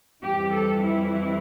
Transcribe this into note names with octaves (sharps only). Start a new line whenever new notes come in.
F2 E3 G3 C4 G4
A4
E4